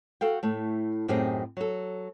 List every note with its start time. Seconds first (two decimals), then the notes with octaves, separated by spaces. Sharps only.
0.21 F#4 A4 F5 G5
0.43 A2 A3
1.08 F#2 A2 C4 D#4 G4 G#4
1.57 F#3 A4